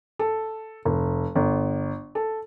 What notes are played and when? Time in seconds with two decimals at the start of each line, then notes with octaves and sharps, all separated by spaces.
0.19 A4
0.85 F1
1.35 G1
2.15 A4